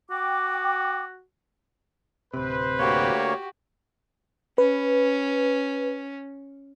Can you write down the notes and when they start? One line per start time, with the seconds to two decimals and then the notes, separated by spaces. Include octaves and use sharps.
0.11 F#4 G5 D6
2.34 D1 C3 B4 C5
2.79 D2 A#3 F#4 G4 C#5
4.58 C#4 B4